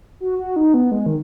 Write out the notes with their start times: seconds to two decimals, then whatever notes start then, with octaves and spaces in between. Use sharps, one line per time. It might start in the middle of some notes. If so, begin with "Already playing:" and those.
0.20 F#4
0.39 F#4
0.56 D#4
0.74 B3
0.92 G#3
1.06 D#3